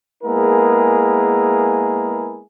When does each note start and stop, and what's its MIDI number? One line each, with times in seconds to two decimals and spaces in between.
0.24 2.40 56
0.24 2.40 58
0.24 2.40 59
0.24 2.40 64
0.24 2.40 68
0.24 2.40 70